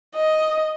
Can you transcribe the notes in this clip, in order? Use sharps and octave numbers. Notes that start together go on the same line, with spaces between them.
D#5